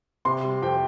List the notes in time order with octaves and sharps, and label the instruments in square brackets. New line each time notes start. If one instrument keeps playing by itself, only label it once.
[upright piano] C3 C6
G3
F2 G5